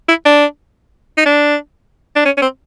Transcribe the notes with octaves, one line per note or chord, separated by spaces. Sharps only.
E4
D4
D#4
D4
D4
C#4
C#4
C4